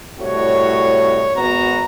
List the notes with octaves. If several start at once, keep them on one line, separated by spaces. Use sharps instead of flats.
C2 A2 F#4 C#5
G#1 B3 F#4 A#5